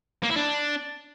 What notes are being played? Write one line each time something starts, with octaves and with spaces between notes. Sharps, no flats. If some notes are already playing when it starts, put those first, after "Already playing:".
A#3
E4
D4